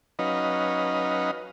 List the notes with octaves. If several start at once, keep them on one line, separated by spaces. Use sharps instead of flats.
F#3 C#4 D#4 B4 D#5 F5